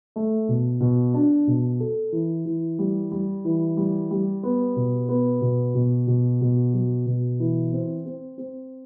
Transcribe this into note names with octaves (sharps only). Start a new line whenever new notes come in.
A3
B2
B2
D4
B2
A4
E3
E3
G3
G3
E3
G3
G3
B3
B2
B3
B2
B2
B2
B2
F#3
B2
E3
C4
C4
C4